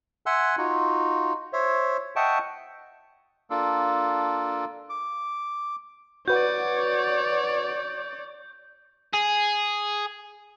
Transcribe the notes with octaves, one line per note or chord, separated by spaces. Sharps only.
E5 F#5 G#5 C6 E6 F#6
D#4 F4 F#4
C5 C#5 E5
D#5 E5 F#5 G5 A5 C#6
A#3 D4 F4 A4
D6
F#4 B4 C#5 D5 F#5 G6
G#4